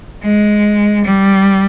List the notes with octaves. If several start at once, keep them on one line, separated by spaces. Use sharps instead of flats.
G#3
G3